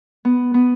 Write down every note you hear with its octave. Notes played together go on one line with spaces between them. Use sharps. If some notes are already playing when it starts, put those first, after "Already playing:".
B3
B3